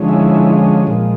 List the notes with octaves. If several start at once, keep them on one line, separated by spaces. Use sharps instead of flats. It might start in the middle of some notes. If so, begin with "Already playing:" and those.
Already playing: D3 F3 G#3 C#4
E4
A#2 F3 G#3